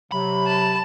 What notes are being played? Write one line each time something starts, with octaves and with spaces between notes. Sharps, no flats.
C3 F#3 B5
A5